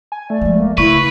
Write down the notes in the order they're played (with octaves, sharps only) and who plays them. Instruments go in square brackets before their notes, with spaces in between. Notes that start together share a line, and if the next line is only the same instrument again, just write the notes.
[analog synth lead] G#5
[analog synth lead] A3 [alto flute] D5
[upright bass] F3 G#3
[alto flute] A#3
[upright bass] C#3 [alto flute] E4 [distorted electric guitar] B4 [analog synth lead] C#6